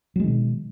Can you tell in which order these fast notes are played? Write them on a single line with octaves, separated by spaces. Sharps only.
F#3 G#3 D#3 B2